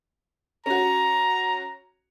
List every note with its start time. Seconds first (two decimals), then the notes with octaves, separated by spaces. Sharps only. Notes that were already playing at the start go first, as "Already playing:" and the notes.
0.66 C#4 F#4 A#5